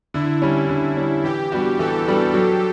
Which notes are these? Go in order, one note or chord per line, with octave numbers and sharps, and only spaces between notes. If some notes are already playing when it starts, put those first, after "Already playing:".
D3 E4
G3 C#4
D3
G3 C#4
E3 G4
G3 B3 D4 F#4
E3 A4
G3 B3 D4 F#4
F#3